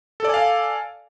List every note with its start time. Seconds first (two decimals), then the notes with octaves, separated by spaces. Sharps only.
0.20 A4
0.25 D5
0.29 G#5
0.34 F5